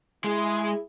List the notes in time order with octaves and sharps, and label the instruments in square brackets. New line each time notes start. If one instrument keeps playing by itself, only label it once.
[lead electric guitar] G#3 [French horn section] E4 G#4